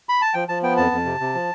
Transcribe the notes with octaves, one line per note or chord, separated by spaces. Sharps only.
B5
A5
F3 G5
F3 A5
B3 G5
F2 A5
F2
C3
C3
F3